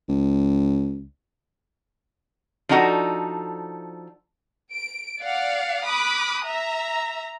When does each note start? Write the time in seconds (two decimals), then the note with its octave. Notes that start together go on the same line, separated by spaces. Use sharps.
0.08 C#2
2.69 F3 D4 D#4 F#4 A4
4.72 D7
5.20 D5 F5 F#5
5.86 B5 D6 D#6 F#6
6.44 E5 A#5